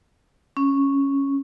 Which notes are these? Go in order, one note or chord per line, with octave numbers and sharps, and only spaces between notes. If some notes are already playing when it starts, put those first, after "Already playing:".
C#4